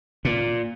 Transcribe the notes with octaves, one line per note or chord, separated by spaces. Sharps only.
A#2